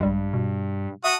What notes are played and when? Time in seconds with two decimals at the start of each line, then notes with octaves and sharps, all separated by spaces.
0.01 A#1 G2 G3 G#3
0.34 B2
1.04 F#4 E5 A5 D#6